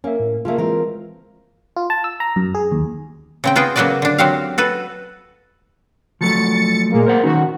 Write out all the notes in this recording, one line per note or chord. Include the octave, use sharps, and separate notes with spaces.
A#3 C#4 E5
A2
C#3 A3 A#3 F4 E5
E3 G#3 C4 F4 A#4
F4
A5
E6
A#5
F#2
G#4
D#2
C#3 C4 G5
B3 F4 F#4 G#4 G5
C#3 F#3 A#3 F#4 B4 D5
D3 D4
F#3 C4 F#4 G4 F5
F#4 A4 B4
F3 F#3 A3 A6 C#7
A#2 G#3 A#3
A#3 A#4 C5 F#5
D#3 C#4 D#4 F#4